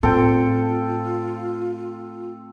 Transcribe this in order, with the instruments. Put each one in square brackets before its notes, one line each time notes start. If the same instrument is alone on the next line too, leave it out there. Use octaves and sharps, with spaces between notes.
[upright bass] A2 [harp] C4 [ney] F4 [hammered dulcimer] A4 G5